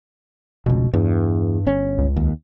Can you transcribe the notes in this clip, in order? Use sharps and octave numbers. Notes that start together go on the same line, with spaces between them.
F1 C#2 B2
E2 G2
G1 C#4
C#2
D#2